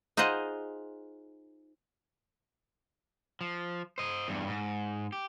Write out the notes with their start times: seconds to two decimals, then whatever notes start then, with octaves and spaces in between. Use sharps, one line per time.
0.17 D#4 F4 G#4 C5 D#5 F#5
3.41 F3
3.98 C5 D#5
4.28 E2 G2
4.47 G#2
5.12 G4